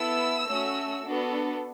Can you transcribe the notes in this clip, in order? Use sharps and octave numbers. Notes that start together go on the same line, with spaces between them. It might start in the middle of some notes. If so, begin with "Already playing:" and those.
Already playing: B3 E4 A4 E6
A3 C#4 F#4
B3 D4 F#4 A4